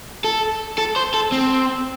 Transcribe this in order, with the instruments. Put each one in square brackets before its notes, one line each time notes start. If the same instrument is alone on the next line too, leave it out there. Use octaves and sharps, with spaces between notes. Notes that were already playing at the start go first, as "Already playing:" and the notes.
[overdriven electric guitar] A4
A4
C5
A4
C4